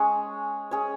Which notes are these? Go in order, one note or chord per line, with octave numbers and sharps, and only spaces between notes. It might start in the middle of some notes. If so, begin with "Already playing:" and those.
Already playing: G#3 C#4 G#4 C#5
C#4 G#4 C#5